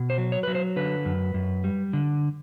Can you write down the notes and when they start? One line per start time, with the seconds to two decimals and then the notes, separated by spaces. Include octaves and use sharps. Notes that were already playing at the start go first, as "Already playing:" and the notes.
Already playing: B2
0.10 C5
0.18 F#3
0.32 C#5
0.43 F#3 B4
0.55 C5
0.76 D3 B4
1.05 F#2
1.34 F#2
1.64 G3
1.93 D3